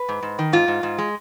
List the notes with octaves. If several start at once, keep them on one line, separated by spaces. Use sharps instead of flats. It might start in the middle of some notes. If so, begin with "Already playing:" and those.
Already playing: B4
G#2
G#2
D#3
G#2 F4
G#2
G#2
G#3